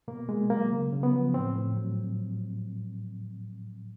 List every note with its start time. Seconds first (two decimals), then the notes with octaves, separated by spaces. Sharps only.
0.08 B2 A#3
0.29 B2 G#3
0.50 F#3 A#3
0.72 C#3
0.92 C#3
1.03 B3
1.13 F3
1.34 A2 C4
1.55 A2
1.77 F#3